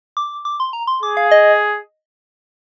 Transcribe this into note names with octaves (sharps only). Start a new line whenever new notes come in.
D6
D6
C6
A#5
C6
G#4 D6
F5
D#5